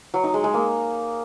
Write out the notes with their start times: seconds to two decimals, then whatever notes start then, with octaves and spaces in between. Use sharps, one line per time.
0.14 F#3
0.24 D#4
0.34 G#3
0.44 G#3
0.54 A#3